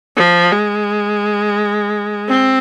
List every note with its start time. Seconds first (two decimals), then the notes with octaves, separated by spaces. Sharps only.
0.17 F3
0.52 G#3
2.28 C4